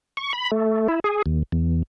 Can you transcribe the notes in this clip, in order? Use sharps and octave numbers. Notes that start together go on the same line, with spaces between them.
C#6
B5
A3
E4
G#4
D#2
E2